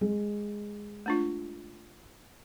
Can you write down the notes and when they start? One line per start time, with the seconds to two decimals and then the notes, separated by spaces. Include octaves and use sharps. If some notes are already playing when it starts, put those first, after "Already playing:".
0.01 G#3
1.06 A3 D4 F4